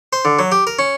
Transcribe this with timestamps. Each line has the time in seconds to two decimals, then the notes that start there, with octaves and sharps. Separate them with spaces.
0.13 C5
0.25 D3
0.39 F#3
0.52 G4
0.67 A#4
0.79 C#4